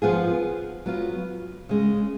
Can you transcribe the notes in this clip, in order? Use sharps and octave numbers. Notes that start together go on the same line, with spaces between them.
F3 B3 F4 G#4
F#3 B3 F4
C#3 G#3 C#4